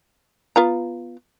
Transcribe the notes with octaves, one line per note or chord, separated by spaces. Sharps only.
B3 F4 A#5